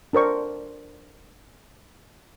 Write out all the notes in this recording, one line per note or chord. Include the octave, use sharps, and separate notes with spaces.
D4 A#4 C5 C#6